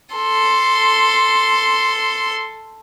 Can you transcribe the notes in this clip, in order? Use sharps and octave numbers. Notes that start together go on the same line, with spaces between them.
A4 C6